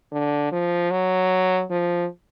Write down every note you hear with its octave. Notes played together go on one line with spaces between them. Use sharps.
D3
F3
F#3
F3